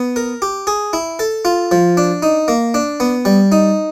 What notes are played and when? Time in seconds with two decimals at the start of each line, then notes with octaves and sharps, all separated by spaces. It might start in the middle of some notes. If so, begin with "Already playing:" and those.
Already playing: B3
0.16 A#4
0.42 G4
0.67 G#4
0.93 E4
1.19 A4
1.45 F4
1.71 F3
1.97 D4
2.23 D#4
2.48 A#3
2.74 D4
3.00 B3
3.25 G3
3.52 D#4